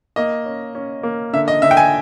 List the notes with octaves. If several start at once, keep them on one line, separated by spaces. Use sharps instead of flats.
A#3 D#5
C#4
C#4
A#3
D3 E5
D#5
D3 E5
G5
G#5